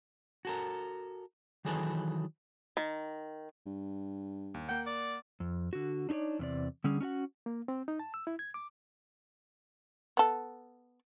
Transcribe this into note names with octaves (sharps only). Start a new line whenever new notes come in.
F#4 A4 A#4
D#3 E3 F#3 G#4 A4 B4
D#3
G2
D#2
A#3 F#5 G5
D5
F2
D3 F#4
D4 D#4 F#4 C#5 D5
E2 C3 D5
D3 G3 C#4 G#4
C#4 D4 F#4 F#5
A#3
C4
D#4
A5
E6
E4
G#6
D6
B3 A4